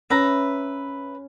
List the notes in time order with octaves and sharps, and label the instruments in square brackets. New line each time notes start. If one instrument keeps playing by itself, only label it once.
[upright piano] C#4 [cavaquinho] B4 E5 A#5